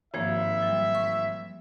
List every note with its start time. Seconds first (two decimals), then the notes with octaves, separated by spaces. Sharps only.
0.14 G#1 G2 F3 A#3 E5
0.62 F#3 G3
0.95 C#6